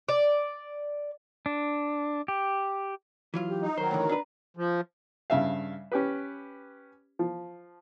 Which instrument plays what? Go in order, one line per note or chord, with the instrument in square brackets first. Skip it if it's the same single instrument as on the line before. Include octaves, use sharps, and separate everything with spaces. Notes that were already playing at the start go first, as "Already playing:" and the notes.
[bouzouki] D5
[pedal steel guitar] D4
G4
[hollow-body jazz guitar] E3 F#3 F4
[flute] G4
[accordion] D#4
[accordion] D#3 F#3 [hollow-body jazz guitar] C5 [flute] A#5
[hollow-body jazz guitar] A2 D3 E3
D4 B4
[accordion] F3
[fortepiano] G2 C#3 E5 F5
C#4 G4 B4
F3